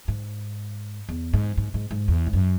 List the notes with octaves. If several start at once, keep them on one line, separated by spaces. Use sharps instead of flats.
G#2
E2
G#2
G#2
G#2
G#2
E2
G#2
F#2